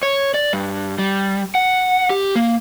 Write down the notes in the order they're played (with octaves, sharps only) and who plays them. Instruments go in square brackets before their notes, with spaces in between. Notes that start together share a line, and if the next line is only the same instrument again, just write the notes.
[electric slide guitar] C#5
D5
G2
G3
F#5
G4
A#3